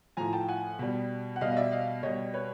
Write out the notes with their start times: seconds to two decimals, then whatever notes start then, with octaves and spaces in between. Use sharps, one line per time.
0.17 A2 F3 G#5 A#5
0.33 G5 A5
0.49 F#5 G#5
0.79 B2 G3
1.36 F#5
1.41 B2 G3 D#5 F5
1.52 D#5
1.57 D5 E5
1.72 D#5 F5
2.03 B2 G3 C#5 D#5
2.34 B4 C#5